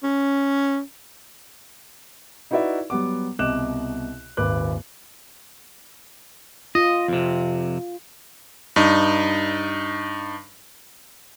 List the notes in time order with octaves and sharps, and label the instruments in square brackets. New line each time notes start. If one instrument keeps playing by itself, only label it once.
[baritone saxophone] C#4
[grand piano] D#4 E4 F#4 B4 D5 E5
F#3 G3 B3 F#5 D6
C2 B2 D#5 D6 F#6 E7
D#1 G#1 A#2 B4 D6 F#6
[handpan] F4 [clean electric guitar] D#5
[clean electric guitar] F2 C3
[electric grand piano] G2 D#4